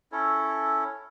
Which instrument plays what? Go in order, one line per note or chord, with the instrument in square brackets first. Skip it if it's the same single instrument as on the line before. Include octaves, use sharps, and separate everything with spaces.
[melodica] C#4 E4 A4 C#5